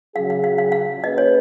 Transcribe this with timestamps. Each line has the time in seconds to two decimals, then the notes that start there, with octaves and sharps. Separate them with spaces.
0.15 C#3 F#3 C#4 G#4 F5
0.30 F5
0.44 F5
0.58 F5
0.72 F5
1.03 A#3 C#4 G#4 B4 D#5
1.18 C#5